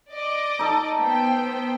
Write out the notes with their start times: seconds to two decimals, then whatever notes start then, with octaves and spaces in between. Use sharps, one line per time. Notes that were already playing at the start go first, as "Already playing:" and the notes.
0.11 D5 D#5 D6
0.59 D#4 A4
0.98 B3 C5 G5